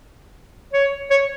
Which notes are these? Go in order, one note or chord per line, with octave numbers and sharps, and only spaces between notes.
C#5
C#5